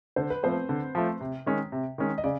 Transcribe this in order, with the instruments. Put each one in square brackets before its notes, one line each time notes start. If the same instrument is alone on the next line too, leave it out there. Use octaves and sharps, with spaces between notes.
[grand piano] D3 [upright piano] C5
[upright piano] B4
[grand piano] F3 A3 [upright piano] C4 C5
[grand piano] D3
F3 A3
C3
D#3 G#3 C#4
C3
D#3 G#3 C#4
[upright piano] D#5
[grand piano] C#3 [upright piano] D5